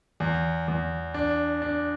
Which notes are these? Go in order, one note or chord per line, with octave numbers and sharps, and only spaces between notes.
E2
E2
D4
D4